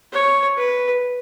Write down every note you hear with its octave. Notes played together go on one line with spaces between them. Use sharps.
C#5
B4